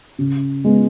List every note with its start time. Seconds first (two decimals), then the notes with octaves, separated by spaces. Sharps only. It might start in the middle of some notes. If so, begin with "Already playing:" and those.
0.19 C#3
0.64 G#3 B3